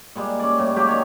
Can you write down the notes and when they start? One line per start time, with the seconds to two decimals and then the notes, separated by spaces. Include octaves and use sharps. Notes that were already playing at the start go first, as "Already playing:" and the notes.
0.15 A#2 G3 G#3
0.39 C#4 D5
0.58 A2 G3
0.76 F#3 G#3 A#3 G4
0.88 D#3 C#5